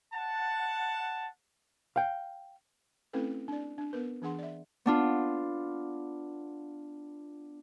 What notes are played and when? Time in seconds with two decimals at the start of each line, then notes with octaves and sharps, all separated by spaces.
0.13 F#5 A5
1.96 F5 G5
3.13 A3 C4 C#4 E4 A4 B4
3.48 D4 D5
3.78 D4
3.93 B3 A#4 B4
4.22 E3 D4 G#4 F#5 C6
4.39 D5 E5
4.86 B3 D4 F4